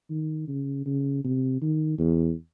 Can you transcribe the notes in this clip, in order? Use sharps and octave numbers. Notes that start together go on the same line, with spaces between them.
D#3
C#3
C#3
C3
D#3
E2